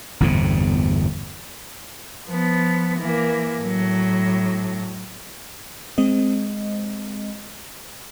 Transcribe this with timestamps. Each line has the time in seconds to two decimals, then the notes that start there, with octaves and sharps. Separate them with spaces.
0.20 G1 E2 A2 C3
2.27 F3 B3
2.99 E3 A#3
3.60 A2 F#3
5.98 G#3 C4 D#5